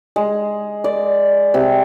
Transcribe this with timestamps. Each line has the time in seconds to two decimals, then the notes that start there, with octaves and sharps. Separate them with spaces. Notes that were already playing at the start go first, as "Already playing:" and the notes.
0.16 G#3
0.84 D5
1.54 C3